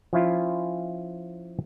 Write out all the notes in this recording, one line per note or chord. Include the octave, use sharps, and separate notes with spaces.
F3 C#4 E4 F4